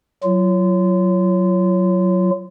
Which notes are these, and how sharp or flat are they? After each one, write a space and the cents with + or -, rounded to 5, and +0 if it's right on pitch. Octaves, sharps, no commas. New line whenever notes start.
F#3 +0 F4 -30